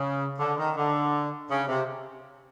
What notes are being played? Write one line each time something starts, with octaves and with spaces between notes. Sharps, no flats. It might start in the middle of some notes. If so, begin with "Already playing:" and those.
Already playing: C#3
D3
D#3
D3
C#3
C3